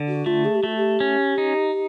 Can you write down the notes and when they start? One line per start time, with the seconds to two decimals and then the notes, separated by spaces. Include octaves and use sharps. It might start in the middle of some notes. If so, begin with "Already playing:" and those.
Already playing: D3
0.08 F#4
0.26 A3 F4
0.45 G#4
0.55 G4
0.63 A3 F#4
0.76 G4
1.00 C#4
1.38 D#4